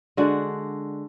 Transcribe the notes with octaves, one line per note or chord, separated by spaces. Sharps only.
D3 G#3 D4 F#4